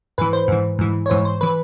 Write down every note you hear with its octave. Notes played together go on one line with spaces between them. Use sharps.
G#2 E3 B4
C5
G#2 E3
G#2 E3
C#5
G#2 E3 C5
C5
E3 B4